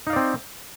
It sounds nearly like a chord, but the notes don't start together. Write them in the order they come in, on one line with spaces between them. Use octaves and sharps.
D#4 F5 D5 C4